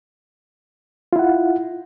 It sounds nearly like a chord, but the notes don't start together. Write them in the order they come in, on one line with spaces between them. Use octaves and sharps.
F4 E4 F#5